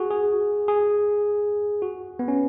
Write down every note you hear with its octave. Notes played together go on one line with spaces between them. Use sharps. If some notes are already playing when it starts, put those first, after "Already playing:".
Already playing: F#4 G#4
G#4
G#4
F#4
B3
C#4